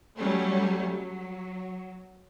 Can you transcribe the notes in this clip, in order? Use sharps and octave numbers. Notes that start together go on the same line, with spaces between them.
F#3 G3 A3 C#4
F#3